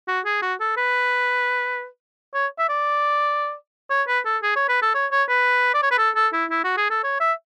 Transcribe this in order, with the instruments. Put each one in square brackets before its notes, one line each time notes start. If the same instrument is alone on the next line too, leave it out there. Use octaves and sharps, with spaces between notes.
[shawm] F#4
G#4
F#4
A4
B4
C#5
E5
D5
C#5
B4
A4
G#4
C#5
B4
A4
C#5
C#5
B4
D5
C#5
B4
A4
A4
E4
E4
F#4
G#4
A4
C#5
E5